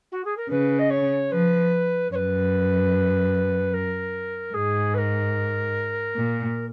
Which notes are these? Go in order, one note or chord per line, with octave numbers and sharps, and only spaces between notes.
F#4
G#4
A#4
C#3 B4
D#5
C#5
F3 B4
F#2 B4 C#5
A#4
G#2 G#4
B4
A#4
A#2